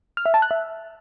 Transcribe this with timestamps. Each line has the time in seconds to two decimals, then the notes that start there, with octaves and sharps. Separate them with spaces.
0.17 F6
0.26 E5
0.34 A5
0.42 F#6
0.51 E5